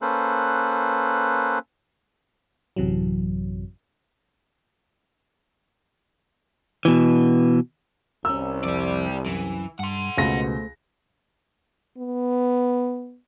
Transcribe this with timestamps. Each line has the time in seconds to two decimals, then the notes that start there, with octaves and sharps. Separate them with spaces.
0.02 A#3 C#4 A4 B4 C5 F#6
2.76 A1 F#2 C3 E3 F#3
6.85 B2 E3
8.25 C2 C#4 A#4 E6
8.64 F2 G4 D5
9.26 F#2 E3
9.79 G2 F#5 C6
10.18 C#2 B2 A3 C5 A#6
11.98 B3